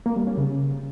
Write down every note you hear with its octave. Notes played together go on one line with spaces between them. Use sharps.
A#3
G3
C#4
C#3